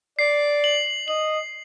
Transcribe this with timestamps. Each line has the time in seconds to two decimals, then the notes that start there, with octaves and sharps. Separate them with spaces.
0.18 D5 C7
0.64 F#7
1.08 D#5 F#7